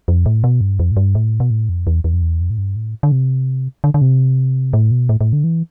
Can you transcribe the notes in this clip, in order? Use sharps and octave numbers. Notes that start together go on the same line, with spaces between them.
F2
A2
B2
G2
F2
A2
G2
A2
B2
A2
F2
E2
E2
F2
E2
F2
A2
G2
A2
D3
C3
D3
D3
C3
A2
B2
A2
A2
D3
E3